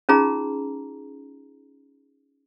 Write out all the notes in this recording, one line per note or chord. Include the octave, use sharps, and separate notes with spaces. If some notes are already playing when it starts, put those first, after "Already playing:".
C#4 D#4 F4 G#4 A#5